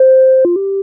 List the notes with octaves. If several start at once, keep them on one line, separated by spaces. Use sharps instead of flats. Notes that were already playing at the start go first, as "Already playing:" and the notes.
Already playing: C5
F4
G4